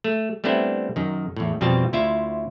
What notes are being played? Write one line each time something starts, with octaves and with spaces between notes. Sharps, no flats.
A3
G3 A3 B3 C4 D4 E4
F#2 D#3
E2 A2
F2 B2 G3 C4 F4 A5
D2 E4 F4 E5